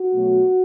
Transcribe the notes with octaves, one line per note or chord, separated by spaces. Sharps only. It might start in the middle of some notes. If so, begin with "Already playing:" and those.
Already playing: F#4
B2 F#3 A3